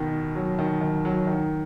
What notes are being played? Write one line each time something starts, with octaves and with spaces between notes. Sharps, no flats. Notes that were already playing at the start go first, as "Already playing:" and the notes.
Already playing: B2 D#3
F#3
D#3
D#3
F#3
D#3